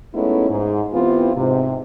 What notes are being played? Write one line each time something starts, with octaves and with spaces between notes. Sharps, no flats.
G#3 A3 B3 C#4 D#4 E4
G#2
E3 B3 C4 E4 F4 G4
G#2 C3